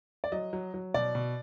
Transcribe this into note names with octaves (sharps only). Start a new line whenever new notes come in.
D5
F#3 D#5
F#3
F#3
B2 D5
B2